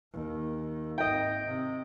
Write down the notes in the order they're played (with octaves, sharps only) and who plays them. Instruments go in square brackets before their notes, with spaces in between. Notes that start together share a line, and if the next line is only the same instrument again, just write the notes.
[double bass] D#2
[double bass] G#1 D#4 [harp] D#5 G5
[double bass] C3